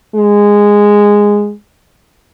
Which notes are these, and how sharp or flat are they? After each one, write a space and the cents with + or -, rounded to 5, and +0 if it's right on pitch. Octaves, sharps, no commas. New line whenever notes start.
G#3 -10